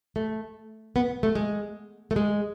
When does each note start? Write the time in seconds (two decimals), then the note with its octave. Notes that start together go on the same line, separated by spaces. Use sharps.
0.16 A3
0.96 B3
1.23 A3
1.35 G#3
2.11 A3
2.16 G#3